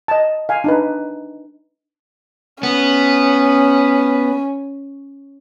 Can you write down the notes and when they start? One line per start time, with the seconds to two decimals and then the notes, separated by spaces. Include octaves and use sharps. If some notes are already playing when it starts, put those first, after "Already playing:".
0.08 D#5 A5
0.49 F5 G#5
0.64 D4 D#4 B4
2.63 B3 C#4